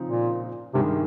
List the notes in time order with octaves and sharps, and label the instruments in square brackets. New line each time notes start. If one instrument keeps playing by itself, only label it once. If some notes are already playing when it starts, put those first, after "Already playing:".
Already playing: [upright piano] C#3 F3 C4 D#4
[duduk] A#2
[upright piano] G2 D#3 G#3 [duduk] C3